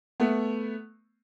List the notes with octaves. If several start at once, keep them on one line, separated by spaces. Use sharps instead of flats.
A3 B3